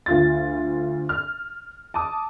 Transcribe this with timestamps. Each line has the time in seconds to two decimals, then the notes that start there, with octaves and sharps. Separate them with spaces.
0.06 D2 F4 A6
1.09 F6
1.94 A5 D6 D#6